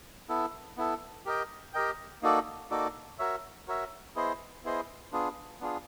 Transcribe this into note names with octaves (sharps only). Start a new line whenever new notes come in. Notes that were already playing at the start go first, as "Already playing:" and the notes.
B3 E4 A4
B3 E4 A4
G4 A#4 D#5 G5
G4 A#4 D#5 G5
A#3 D#4 F#4 A4 D5
A#3 D#4 F#4 A4 D5
F#4 A#4 C#5 E5
F#4 A#4 C#5 E5
B3 E4 G#4 C5 D#5
B3 E4 G#4 C5 D#5
B3 D4 F4 G#4
B3 D4 F4 G#4